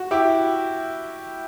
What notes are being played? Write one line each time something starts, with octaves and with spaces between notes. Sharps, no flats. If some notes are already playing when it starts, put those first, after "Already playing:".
Already playing: F#4
E4 G4